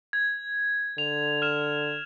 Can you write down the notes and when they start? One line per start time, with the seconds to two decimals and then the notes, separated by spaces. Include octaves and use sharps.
0.13 G#6
0.98 D3 F7
1.42 F6 E7